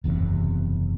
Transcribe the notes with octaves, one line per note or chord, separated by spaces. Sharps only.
F#1 E2 G#2 C3